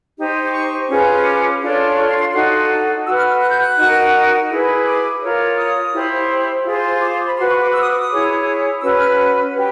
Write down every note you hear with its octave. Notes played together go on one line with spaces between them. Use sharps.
D#4 G4 C5
D6
C#6
C#4 F4 G#4 B4
D6
D4 F4 A4 C#5
C#6
C6
C6
D#4 F#4 A4 C6
F#4 B4 E6
F6
F6
F#6
G6
F#6
D#4 F#4 A#4
E4 G#4 B4
D6
F4 A#4 C#5
D#6
E4 G4 C5
F4 G#4 C5
D6
C6
B5
F#4 B4 C6
C#6
D6
E6
D#6
D6
D#6
E4 G#4 C#5
C#4 F#4 B4 E6
F6
G4 B4